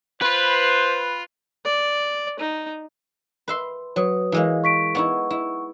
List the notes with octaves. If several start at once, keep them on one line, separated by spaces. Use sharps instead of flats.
F4 B4 C5
D5
D#4
B4 E5 C6
F#3 B4 D#6
E3 G#3 A#3
C#6 B6 D7
B3 D#4 E4 F#5 C#6
E4